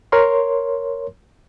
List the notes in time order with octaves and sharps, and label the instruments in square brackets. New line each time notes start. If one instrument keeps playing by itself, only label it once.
[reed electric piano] A#4 C#5 C6